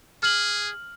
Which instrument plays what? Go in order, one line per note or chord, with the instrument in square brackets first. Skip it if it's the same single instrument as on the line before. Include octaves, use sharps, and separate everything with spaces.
[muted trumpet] G#4 [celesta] F6 F#7